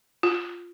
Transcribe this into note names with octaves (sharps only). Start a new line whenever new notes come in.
F4